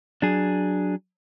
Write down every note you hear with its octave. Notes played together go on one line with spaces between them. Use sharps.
F#3 D4 G#4